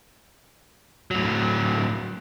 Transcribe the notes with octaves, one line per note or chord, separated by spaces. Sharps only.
A2 F#3